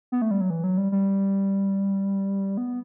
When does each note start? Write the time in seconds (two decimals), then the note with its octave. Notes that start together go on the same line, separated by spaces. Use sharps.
0.12 B3
0.22 A3
0.31 G3
0.41 F#3
0.50 E3
0.64 F#3
0.78 G3
0.92 G3
2.57 B3